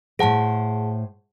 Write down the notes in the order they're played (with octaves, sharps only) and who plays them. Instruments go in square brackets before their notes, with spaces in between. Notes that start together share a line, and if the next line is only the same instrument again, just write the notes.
[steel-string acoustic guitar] A2 C5 [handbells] G#4 F#5 A5